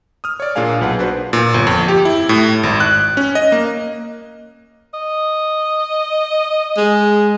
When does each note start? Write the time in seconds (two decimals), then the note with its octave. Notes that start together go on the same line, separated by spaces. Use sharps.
0.24 D#6 F6
0.40 C#5 D5
0.55 A#2 A#3 D4 G#4 F5 G#5
0.81 B1 B4 F#5 A5
0.99 D4 F#4 B4 C5
1.33 A#2
1.54 G1
1.67 F2
1.88 G4
2.05 E4
2.29 A2
2.63 G#1
2.80 F#6
3.17 C#4
3.35 D#5
3.52 A#3
4.94 D#5
6.77 G#3